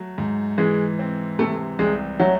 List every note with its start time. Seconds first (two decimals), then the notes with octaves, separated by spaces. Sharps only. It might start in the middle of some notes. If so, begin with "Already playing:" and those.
Already playing: F#3 A3
0.18 G#2
0.58 E3 G#3
0.99 C4
1.39 C3 A3
1.79 C2 G#3
2.20 F#3 A3